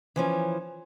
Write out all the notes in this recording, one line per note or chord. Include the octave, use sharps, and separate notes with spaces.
E3 F3 C#4